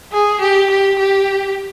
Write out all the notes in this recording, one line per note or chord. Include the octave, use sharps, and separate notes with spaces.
G#4
G4
G4
G4